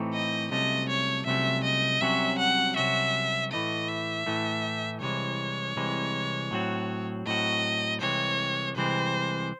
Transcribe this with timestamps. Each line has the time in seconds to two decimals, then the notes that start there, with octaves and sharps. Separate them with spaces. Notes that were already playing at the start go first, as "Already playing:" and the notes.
Already playing: A2 E3 A3 C4 D#4
0.14 D#5
0.51 C2 C3 F#3 A3 C#4 D#5
0.89 C#5
1.26 C2 C3 F#3 A3 C#4 E5
1.64 D#5
2.01 C2 C3 F#3 C#4 F#4 E5
2.39 F#5
2.76 C2 C3 F#3 C#4 F#4 E5
3.52 A2 E3 A3 D#5
3.89 E5
4.26 A2 E3 A3
5.01 C2 C3 E3 G#3 C#5
5.76 C2 C3 E3 G#3
6.51 A2 F#3 C4 F#4
7.26 A2 F#3 C4 F#4 D#5
8.01 C2 C3 E3 G#3 C4 C#5
8.76 C2 C3 E3 G#3 C4 C5